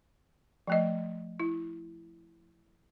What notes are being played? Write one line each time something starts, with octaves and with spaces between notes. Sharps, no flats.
F3 A3 D#5
E4